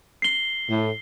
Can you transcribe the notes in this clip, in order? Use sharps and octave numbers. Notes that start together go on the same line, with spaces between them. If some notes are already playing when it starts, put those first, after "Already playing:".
C7 G7
A2